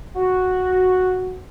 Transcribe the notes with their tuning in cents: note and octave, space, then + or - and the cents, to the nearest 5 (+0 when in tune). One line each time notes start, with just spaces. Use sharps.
F#4 -5